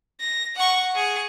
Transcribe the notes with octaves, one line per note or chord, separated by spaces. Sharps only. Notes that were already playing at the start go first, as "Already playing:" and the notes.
A#6
F#5 C#6
G#4 C#7